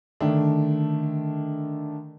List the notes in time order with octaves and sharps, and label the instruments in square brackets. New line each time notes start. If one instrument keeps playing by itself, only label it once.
[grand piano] D3 D#3 A3 D4